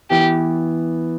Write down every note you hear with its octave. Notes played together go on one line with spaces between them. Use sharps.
E3 B3 E4 G4